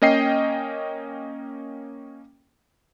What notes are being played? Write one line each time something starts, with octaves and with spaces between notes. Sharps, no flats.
A#3 C#4 D#5 G5 C7